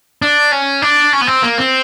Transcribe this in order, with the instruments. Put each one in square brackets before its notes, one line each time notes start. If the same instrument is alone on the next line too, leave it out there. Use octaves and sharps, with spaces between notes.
[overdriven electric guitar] D4
C#4
D4
C#4
B3
C4
A#3
C4